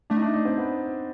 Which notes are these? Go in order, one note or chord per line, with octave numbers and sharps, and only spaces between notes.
A3 D4
D#4
D4
D#4
C4
B3